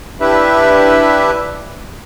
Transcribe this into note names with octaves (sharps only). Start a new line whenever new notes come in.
D4 E4 G4 B4 E5